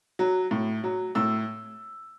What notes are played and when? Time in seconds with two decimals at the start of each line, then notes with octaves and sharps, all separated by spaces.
0.19 F#3
0.51 A2
0.84 F#3
1.15 A2 E6